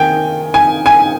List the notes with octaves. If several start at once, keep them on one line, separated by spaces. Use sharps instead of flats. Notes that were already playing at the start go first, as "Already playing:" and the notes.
Already playing: D#3 G5 G#5
G#5
G#5